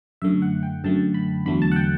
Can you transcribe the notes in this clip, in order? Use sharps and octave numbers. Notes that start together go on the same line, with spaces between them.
F#2 D3 A3 E5
F#5
G5
F#2 D3 A3 A5
B5
E2 D3 F#3 A3 B5
A5
F#5
G5